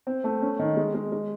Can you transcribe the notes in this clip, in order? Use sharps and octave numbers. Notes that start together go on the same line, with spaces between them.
C4
A3
C#4
D#3
G#3
G#3
G#3